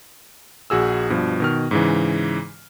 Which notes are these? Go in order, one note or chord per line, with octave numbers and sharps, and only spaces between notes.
A#1 F#4 G#4 E6
G2 B2 F3
B2 D#3 F6
G#2 C#3 E3